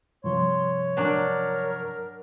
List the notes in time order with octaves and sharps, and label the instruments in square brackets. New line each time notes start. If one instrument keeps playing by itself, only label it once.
[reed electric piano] G2 C3 F3 [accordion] C#5 [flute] C6
[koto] F#3 D4 D5 [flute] A#4